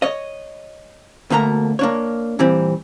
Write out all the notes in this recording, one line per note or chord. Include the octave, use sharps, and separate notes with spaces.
C#5 D#5
D2 B2 A3 A#3 A#5
A#3 D4 C#5
A#2 E3 G3 C4